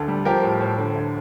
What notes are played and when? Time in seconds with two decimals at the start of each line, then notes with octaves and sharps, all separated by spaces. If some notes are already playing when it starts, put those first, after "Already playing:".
Already playing: D2 D3 A4
0.08 G3
0.25 F3 G4 A#4
0.43 A2
0.60 A2
0.78 D3
0.95 D2